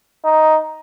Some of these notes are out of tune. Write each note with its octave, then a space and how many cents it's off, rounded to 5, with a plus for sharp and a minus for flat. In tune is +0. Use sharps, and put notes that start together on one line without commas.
D#4 +5